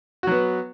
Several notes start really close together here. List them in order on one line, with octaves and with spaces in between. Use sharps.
F#4 F#3 B3